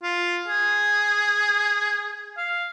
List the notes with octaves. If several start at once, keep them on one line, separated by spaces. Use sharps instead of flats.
F4
G#4
F5